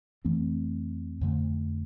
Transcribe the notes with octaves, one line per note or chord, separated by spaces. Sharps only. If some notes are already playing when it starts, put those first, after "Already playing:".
F2 E3 A3 C4
F2 D3 A3